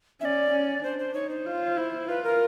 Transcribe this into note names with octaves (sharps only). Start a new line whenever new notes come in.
C#4 D5 E5
C#4
D4 C5
C5
D#4 C#5
C5
F4
E4
F4 B4
A#4